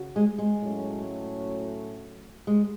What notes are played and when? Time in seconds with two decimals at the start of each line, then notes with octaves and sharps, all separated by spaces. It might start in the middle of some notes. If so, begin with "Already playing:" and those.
Already playing: C#3 C#4 F#4
0.16 G#3
0.38 G#3
0.61 A2 F#3 A3 C#4
2.47 G#3